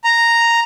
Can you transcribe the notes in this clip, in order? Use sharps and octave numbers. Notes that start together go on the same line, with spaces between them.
A#5